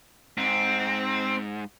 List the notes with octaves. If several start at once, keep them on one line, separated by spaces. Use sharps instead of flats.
G#2 C4